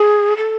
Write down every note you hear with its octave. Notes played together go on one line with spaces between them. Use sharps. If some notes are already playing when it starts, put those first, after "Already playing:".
Already playing: G#4
A4